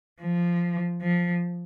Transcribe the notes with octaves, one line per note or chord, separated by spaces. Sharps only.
F3
F3